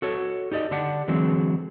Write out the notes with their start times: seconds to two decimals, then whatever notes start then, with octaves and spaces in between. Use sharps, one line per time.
0.02 F#4 A4 C#5
0.52 D#4 G4 D5 D#5
0.71 D3 D4 G4 F#5
1.08 D3 E3 F#3 G#3 C4 G#4